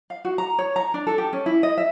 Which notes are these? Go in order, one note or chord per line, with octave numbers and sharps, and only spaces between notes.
F5
F#4
A#5
C#5
A#5
D4
A4
G4
C#4
E4
D#5
E5